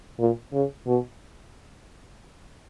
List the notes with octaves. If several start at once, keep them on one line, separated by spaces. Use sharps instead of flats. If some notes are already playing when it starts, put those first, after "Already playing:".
A#2
C#3
B2